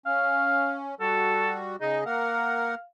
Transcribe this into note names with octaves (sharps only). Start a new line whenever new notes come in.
C#4 F5
G3 F#4 A4
C#3 D#4 G#4 D#5
A#3 A#4 F5 F#5